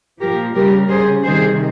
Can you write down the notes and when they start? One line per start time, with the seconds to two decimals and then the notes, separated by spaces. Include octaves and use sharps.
0.20 A#2 F3 G4 A#4
0.56 C#3 G3 G4 A#4
0.89 C#3 G3 G#4 C5
1.24 C3 D#3 G3 G#4 C5